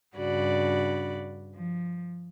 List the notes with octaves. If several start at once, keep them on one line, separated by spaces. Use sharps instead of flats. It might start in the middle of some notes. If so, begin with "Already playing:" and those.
G2 C#3 D4 F#4 D5 B5
F3